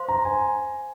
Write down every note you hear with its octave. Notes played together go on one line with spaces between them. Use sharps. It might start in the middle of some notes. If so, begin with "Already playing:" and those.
Already playing: C5 F5 C6
A#5
G#5